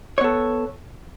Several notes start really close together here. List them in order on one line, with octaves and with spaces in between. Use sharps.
C#5 B3 A4